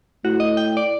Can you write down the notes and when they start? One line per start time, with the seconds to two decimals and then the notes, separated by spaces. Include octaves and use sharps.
0.25 A2 F#4
0.40 D#5
0.57 G5
0.77 D5